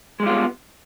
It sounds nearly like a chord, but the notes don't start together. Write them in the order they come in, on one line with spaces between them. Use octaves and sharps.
G#3 G3 F4 B3